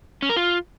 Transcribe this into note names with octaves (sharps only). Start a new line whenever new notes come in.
C#4
A#4
F4